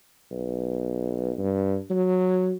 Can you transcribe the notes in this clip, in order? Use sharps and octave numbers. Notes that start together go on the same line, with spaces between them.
B1
G2
F#3